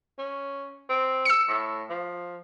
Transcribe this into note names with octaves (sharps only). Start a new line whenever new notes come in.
C#4
C4
E6 C#7
A2
F3